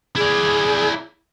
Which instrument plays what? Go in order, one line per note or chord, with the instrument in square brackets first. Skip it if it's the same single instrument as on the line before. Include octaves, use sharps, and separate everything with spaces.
[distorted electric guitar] E4 D5 [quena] G#4